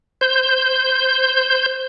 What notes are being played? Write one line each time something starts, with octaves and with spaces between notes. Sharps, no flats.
C5 G6